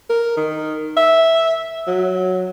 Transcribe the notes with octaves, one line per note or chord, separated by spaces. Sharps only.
A#4
D#3
E5
F#3